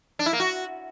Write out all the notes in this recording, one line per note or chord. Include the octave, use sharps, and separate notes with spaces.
D4
E4
A#3
F#4